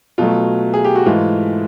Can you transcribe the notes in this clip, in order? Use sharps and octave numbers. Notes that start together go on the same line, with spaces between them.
B2 F#3 A3 F4
G#4
G4
F#4
G#2 E3 A3 F4